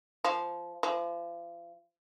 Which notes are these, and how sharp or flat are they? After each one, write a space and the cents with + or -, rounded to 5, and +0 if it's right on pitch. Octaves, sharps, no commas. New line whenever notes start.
F3 -10
F3 -35